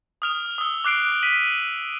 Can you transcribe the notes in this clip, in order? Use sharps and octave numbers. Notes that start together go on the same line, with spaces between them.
D#6 F6 F7
D#6 E6
D6 F#6 C7 D7
B6 D#7 F#7